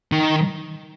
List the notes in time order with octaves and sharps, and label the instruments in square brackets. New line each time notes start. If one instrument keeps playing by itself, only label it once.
[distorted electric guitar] D#3